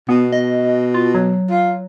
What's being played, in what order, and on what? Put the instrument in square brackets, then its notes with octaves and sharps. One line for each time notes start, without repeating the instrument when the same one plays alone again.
[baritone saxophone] B2 [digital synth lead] B3
[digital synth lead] D#5
F4
F#3
[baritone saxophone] F4